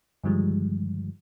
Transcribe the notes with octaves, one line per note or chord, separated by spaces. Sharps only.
G2 D3 D#3 F3 G3 G#3